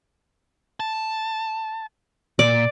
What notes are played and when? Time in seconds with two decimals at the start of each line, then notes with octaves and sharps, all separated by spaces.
0.80 A5
2.39 A#2 D5